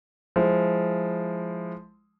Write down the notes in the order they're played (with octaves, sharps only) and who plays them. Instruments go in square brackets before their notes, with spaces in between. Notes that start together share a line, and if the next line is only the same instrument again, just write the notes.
[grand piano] F3 G#3 E4